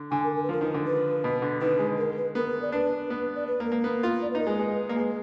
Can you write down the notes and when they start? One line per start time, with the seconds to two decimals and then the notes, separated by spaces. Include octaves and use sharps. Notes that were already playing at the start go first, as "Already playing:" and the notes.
Already playing: D3
0.11 D3 G#5
0.24 A#4
0.36 A#4
0.43 B4
0.49 F3 A#4
0.61 D#3
0.74 D3
0.86 B4
1.24 B2
1.42 D3
1.61 D#3 B4
1.79 G#3
1.98 A#4
2.17 B4
2.35 B3 A#4
2.62 D5
2.72 D4 B4
3.10 B3
3.36 D5
3.47 B4
3.60 A#3
3.65 A#4
3.72 A#3
3.84 B3
4.03 F4
4.22 D5
4.31 D#4 B4
4.40 A#4
4.47 G#3 B4
4.59 G#3 B4
4.89 A#3
4.96 G#3